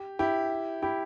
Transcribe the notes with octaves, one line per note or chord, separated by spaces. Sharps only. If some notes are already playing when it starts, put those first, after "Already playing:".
Already playing: G4
E4 G4
E4 G4